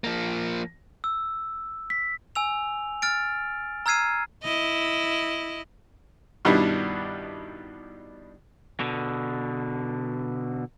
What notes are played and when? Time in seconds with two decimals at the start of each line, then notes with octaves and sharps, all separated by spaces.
0.04 F3 A#3
1.04 E6
1.90 B6
2.35 G#5 E6 F7
3.02 F6 A6 D7
3.86 A#5 E6 F6 G#6 C7 D#7
4.43 E4 D#5
6.45 G2 B2 D#3 G3 D4 E4
8.80 B2 D3